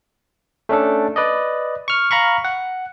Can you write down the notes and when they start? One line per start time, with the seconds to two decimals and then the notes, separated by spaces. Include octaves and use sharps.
0.69 A3 C#4 D4 A4
1.16 B4 D5 D#5
1.88 C#6 F6
2.11 F5 A#5 B5 C#6
2.44 F#5